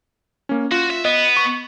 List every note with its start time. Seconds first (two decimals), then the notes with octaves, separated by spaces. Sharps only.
0.49 A#3 C#4
0.71 F4 F#4
0.90 E5
1.05 B3 D#5
1.37 C#6